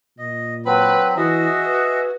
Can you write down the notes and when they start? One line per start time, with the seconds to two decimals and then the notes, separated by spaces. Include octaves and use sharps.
0.18 A#2 D#5
0.65 F#3 C4 B4 B5
1.17 E3 F#4 G#4 D#5 E5
1.66 B4